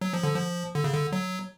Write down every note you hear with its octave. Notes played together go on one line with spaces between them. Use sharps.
F#3
F3
D3
F3
D3
C#3
D3
F#3